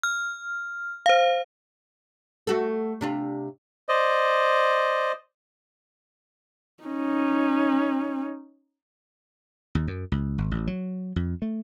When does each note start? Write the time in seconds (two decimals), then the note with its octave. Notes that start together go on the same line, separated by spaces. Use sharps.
0.03 F6
1.06 C5 F5
2.47 A3 F#4 A4
3.01 C3 D4 F4
3.89 C5 D5 D#5
6.83 C#4 D#4
9.75 D#2
9.87 F#2
10.12 C#2
10.38 G#1
10.51 A1
10.67 F#3
11.16 F2
11.42 A3